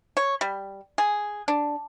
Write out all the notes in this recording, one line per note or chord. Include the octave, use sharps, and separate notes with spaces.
C#5
G3
G#4
D4